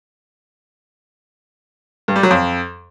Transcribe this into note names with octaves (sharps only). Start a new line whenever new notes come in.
G2
G3
F#3
F2